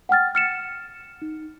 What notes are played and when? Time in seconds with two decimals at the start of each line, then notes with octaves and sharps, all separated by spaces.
0.09 F#5 G5 F6 A6
0.35 F6 C#7 E7
1.22 D#4